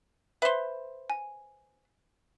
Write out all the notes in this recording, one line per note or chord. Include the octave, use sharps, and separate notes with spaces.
B4 C5 E5 G7
G#5